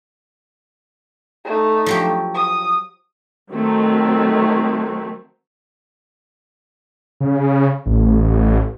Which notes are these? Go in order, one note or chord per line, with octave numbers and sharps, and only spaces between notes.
A3 D#4
F3 F#3 G4
D#6
D#3 F#3 A3 C4
C#3
A1